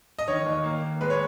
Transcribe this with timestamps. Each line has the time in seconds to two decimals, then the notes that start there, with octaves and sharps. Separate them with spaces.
0.19 D#5
0.28 D#3 C#5
0.46 D#2
0.64 A#3
0.82 A#3
1.01 G#3 B4
1.10 C#5